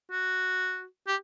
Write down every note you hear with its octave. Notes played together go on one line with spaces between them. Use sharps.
F#4
G4